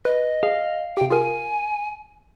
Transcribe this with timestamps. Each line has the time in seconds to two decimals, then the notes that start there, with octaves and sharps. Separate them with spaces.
0.05 B4 D#5
0.43 G#4 F5
0.97 C3 G4 G5
1.10 F4 G#4 A#4 G#5